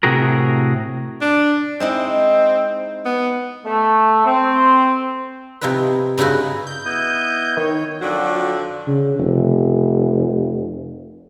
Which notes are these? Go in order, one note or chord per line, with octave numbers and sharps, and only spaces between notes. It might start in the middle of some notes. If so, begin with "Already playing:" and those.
A2 C3 F#4 G#4 A#4
D4
G#3 C4 D#4 E4
B3
A3
C4
C3 F3 D#4 E4 B4
G2 C#3 D#4 E4 F#4
G6
B3 E4 D#5
D#3 C#5
F2 D3 F#3 F4 F#4 D5
C#3
F1